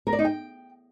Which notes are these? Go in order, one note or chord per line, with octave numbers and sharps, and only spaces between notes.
A#4
D5
D#4
G5